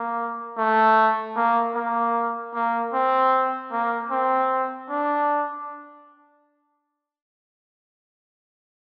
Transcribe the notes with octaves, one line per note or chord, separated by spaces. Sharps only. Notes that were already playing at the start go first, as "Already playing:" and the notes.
Already playing: A#3
A3
A#3
A#3
A#3
C4
A#3
C4
D4